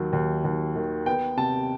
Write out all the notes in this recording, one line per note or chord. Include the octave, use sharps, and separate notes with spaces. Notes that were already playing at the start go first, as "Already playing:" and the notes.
Already playing: D#2 D#3 F#3
D#2
D#2
D#3
B3 G5
C3 A5